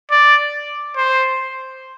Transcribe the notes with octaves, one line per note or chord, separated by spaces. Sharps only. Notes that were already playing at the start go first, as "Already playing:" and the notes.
D5
C5